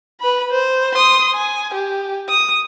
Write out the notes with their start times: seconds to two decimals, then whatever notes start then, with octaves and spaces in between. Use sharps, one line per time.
0.21 B4 B5
0.51 C5
0.93 C6 D#6
1.35 G#5
1.74 G4
2.29 D#6